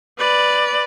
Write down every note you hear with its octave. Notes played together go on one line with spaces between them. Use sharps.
B4 D5